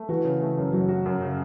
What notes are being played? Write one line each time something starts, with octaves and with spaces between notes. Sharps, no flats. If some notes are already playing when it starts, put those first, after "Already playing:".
Already playing: A3
E3 F#4
C#3
A3
F#2
F#3 F#4
F#4
F#2
C#3